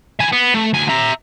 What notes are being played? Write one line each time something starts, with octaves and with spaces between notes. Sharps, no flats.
E4 G#5
B3
A3
D2 G#5
E5 A#5